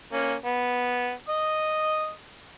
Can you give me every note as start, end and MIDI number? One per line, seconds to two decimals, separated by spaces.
0.13 0.34 58
0.13 0.34 61
0.46 1.11 59
1.29 2.11 75
1.29 2.11 87